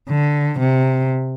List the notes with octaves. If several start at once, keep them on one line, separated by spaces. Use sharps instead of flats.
D3
C3